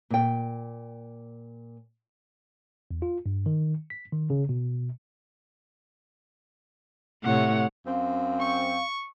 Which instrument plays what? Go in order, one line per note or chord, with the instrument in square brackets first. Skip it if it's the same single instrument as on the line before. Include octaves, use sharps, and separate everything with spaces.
[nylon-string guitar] A#2 G5
[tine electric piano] E2
F4
G2
D#3
B6
D#3
C#3
B2
[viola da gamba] A2 C3 C#5 [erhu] F#5
[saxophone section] F#2 C4 [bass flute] F5
[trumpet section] C#6